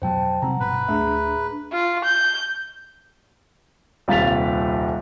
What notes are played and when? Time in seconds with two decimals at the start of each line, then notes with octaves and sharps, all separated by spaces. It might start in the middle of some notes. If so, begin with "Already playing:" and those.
0.02 F2 B2 F#3 C5 G5 A5
0.42 C3 F#3 G3 C4 F#5 A#5
0.60 G1 B2 B4
0.88 D1 A3 D4 G#4 E5 A#5
1.73 F4
2.04 G6
4.08 D#1 C2 F5 A6 B6 F7